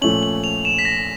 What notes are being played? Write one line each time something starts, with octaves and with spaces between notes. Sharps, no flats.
A#2 F3 A3 C#4 F#7
F#7
F7
E7
B6
A#6